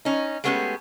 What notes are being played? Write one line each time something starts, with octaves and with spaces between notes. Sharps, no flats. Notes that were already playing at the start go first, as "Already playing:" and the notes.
C#4 D#4
G#3 A3 B3 C#4 G4 G#4